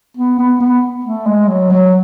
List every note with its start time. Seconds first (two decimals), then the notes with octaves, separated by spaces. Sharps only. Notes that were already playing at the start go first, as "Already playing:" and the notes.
0.17 B3
0.38 B3
0.60 B3
1.04 A3
1.26 G#3
1.48 F#3
1.70 F#3